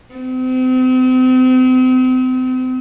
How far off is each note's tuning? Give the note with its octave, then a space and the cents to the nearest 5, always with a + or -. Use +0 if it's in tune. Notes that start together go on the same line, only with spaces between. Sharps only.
C4 -35